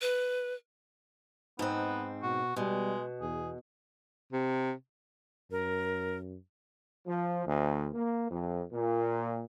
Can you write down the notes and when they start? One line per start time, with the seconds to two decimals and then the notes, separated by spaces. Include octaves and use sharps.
0.02 B4
1.59 G#2 B3 C4 D#4
2.23 B2 F#4
2.56 B2 G3 G#3
3.21 E2 G#4
4.33 C3
5.51 F#2 A#4
7.07 F3
7.45 D2
7.94 A#3
8.29 F2
8.72 A#2